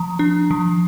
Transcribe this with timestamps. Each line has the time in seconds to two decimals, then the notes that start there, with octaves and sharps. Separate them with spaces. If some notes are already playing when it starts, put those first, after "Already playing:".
Already playing: F3 A#5
0.19 D4
0.51 F3